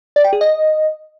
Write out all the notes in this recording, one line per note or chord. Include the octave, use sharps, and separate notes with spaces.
D5
G5
G#4
D#5